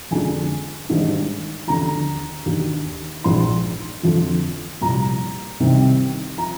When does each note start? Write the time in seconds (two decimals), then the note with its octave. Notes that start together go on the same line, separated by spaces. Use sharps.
0.11 F2 D3 F3 G#3 D4 G#5
0.89 G#1 G#2 D#3 G3 D4
1.67 D#2 D3 F3 A#5
2.46 D#2 D#3 A#3 D4
3.24 A#1 A#2 G#3 D#4 C6
4.03 F2 D3 F3
4.81 C2 A#2 F3 A#5
5.60 C2 C3 D#3 G3 C4
6.38 F3 A#5